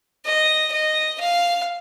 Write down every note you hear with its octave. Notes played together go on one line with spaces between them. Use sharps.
D#5
D#5
F5